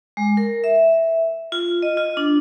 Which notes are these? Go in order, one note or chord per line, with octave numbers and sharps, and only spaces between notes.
G#3
A#4
E5
F4
D#5
F4
D4